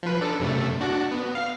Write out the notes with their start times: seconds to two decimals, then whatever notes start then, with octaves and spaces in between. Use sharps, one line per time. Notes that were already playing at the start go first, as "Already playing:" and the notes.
0.03 F3 B4
0.21 D4 A4
0.40 F#2 C3 A3
0.81 D4 F#4
1.12 B3
1.35 F5